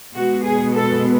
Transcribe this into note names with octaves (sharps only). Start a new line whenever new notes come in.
B2 G#3 B3 F#4
G#4
A4